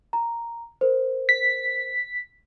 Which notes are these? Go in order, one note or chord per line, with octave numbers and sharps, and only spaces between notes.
A#5
A#4 C5
B6